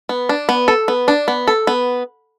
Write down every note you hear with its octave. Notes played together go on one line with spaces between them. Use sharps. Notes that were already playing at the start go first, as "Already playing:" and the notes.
B3
D4
B3
A4
B3
D4
B3
A4
B3